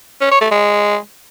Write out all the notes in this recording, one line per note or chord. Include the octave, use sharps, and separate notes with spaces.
C#4
C#5
A3
G#3